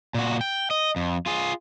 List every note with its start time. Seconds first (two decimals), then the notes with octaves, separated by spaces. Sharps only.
0.14 A#2 F#4
0.41 G5
0.71 D#5
0.96 F2
1.26 F4 G#4